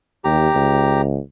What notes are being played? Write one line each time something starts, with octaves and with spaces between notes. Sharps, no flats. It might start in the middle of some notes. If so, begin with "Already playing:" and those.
D#2 G4 A#5
C#2